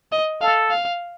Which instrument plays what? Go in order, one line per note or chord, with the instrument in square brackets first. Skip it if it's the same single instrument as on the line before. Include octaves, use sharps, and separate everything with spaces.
[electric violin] D#5
[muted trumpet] A4 [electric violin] F5
[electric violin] F5